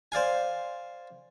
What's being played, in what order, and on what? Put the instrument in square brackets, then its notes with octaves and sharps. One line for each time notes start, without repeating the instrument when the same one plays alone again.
[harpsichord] C5 D5 F5 G#5